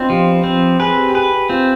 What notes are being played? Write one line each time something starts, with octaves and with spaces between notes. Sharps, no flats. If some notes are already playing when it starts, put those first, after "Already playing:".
Already playing: B3 C4 D4 D#4 F4
F3 G4
C4
G#4 B4
G4
G4
G#4 B4
G4
C4 F4